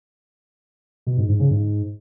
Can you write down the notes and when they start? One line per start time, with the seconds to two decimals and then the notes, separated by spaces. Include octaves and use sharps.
1.07 B2
1.18 G#2
1.29 G#2
1.40 C#3
1.51 G#2